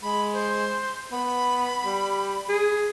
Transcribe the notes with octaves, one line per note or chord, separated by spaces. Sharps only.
G#3 B5
C5
B3 B5
G3
G#4